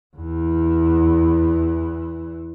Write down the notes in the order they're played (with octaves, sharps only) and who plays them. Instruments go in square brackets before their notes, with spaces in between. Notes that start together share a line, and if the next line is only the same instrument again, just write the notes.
[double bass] E2 E3